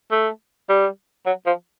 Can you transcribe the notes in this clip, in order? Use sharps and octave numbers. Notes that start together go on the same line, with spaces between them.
A3
G3
F#3
F3